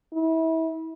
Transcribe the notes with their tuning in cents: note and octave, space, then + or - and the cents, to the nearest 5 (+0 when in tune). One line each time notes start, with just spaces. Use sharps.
E4 -30